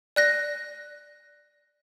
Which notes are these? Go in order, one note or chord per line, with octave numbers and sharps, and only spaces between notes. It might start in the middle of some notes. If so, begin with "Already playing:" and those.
D5 F#6 A#6